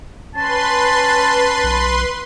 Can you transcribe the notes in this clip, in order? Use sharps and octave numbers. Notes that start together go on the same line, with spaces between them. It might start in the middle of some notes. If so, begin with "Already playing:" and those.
C#4 B4 A5 C6
B1